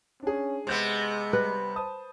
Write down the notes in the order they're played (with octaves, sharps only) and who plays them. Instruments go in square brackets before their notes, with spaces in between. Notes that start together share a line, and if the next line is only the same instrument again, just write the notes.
[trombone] C#4 [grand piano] D4 G#4
[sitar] C3 B3 [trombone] G#3 [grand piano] C6 G6
[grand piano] G3 [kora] B4
[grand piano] C5 A5 D#6